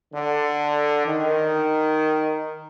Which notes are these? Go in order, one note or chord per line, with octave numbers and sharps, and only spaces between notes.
D3
D#3